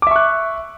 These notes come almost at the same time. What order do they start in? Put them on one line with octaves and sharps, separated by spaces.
D6 E5 C#6 F#6